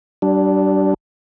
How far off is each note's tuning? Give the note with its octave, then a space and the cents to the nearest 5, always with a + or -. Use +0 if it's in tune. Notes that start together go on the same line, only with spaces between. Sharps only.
G3 -35 D4 -5